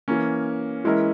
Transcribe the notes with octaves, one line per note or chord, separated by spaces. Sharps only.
E3 A#3 C#4
E3 G#3 C#4 E4 A#4